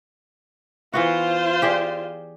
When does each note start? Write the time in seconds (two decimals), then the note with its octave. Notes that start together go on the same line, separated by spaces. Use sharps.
0.94 E3 B3 F4 F#4 C5
1.62 G4 G#4 D5